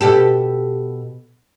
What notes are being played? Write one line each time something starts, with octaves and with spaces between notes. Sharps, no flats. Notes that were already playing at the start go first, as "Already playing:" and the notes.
B2 G4 A4